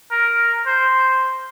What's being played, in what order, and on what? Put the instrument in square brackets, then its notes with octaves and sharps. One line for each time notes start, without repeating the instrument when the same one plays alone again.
[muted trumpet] A#4
C5